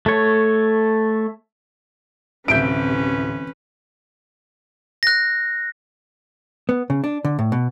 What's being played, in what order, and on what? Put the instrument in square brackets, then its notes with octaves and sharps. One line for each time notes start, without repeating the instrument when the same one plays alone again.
[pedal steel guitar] A3 C#5
[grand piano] D1 E5 G6 [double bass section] C3 E3 [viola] C#4 B4 [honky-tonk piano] D7
[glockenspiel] F#6 A#6
[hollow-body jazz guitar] B3
C#3
D4
D3
A2
B2